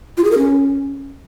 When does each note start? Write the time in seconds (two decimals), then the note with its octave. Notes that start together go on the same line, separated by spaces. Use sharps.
0.17 F4
0.24 G#4
0.31 A#4
0.38 C#4